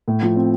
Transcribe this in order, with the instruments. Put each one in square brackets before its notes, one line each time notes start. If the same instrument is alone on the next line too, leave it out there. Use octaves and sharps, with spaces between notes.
[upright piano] A2
F3
C4